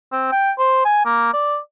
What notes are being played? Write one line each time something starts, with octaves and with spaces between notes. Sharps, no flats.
C4
G5
C5
G#5
A#3
D5